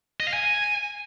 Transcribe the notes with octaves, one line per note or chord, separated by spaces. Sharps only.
D#5
F5
G#5